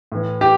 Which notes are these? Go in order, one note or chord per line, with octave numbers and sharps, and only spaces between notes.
A2 E3
G4